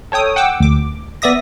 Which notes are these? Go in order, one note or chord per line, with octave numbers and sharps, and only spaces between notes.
A4 C#5 G5 D#6
F#5 G5 D6 E6
D2 D6
B3 D5 E5 D#6 A#6